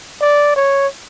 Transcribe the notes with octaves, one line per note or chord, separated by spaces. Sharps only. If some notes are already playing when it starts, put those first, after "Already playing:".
D5
C#5